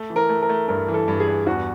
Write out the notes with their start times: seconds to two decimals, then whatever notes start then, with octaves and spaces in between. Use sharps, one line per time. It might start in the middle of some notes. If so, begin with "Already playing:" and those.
Already playing: A3
0.10 E3
0.16 A#4
0.29 A3
0.42 A#4
0.49 A3
0.68 G2 A#4
0.88 E3
0.94 A4
1.08 G2
1.20 G#4
1.27 G2
1.46 E2 F#4